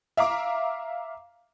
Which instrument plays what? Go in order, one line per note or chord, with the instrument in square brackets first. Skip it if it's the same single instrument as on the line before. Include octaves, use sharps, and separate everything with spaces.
[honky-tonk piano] E5 F5 A#5 D6